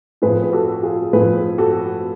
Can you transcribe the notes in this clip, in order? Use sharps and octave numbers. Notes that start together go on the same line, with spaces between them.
A2 F3 G#4 B4
B4
F#4 A4
F4 G#4
A2 F3 G#4 B4
F#4 A4